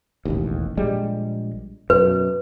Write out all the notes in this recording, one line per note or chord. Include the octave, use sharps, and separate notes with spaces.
E1 A1 D#2
A#1 G3 G#3
F#2 B2 B4